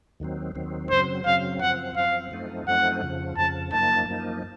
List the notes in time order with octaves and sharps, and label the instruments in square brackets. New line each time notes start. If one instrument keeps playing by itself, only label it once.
[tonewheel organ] D#2 D#3 F#3 C4
D#2 D#3 F#3 C4
[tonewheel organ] F#2 C#3 F#3 C4 [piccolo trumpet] C5
[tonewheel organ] F#2 C#3 F#3 C4 [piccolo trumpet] F5
[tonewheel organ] F#2 F3 C4 [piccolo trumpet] F#5
[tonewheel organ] F#2 F3 C4 [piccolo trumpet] F5
[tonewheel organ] F#2 F3 A3 C4 D#4
[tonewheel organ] F#2 F3 A3 C4 D#4 [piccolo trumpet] F#5
[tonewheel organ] F2 C#3 F3
[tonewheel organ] F2 C#3 F3 [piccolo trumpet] A5
[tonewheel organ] F#2 F3 A#3 D#4 [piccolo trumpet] A5
[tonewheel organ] F#2 F3 A#3 D#4